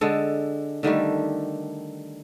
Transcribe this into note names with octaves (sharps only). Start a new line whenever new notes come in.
D3 G#3 A4
D3 D#3 G3 A3